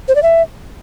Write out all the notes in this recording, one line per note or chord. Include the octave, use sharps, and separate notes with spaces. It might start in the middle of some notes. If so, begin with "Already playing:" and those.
C5
D5
E5